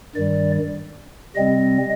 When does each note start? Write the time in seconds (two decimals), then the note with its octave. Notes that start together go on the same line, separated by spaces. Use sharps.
0.15 G2 D#3 G3 D5
1.35 C3 G3 C4 D#5